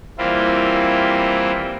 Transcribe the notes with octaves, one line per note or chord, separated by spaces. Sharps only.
E3 G3 A#3 C4 E4 F4